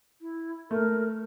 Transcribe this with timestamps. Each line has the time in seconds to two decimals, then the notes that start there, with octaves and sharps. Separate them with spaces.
0.21 E4
0.71 A3 A#4